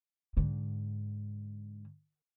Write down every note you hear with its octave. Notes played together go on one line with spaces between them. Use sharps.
G#2 D3